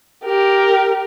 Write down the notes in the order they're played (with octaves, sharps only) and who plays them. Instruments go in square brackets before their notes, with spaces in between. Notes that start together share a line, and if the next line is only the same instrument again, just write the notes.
[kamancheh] G4 A#4